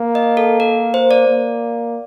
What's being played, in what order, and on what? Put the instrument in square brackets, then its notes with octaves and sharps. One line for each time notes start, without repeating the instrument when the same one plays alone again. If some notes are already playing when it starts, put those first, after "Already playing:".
Already playing: [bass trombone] A#3
[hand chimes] D#5
A4
A#4
C5
D5
[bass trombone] A#3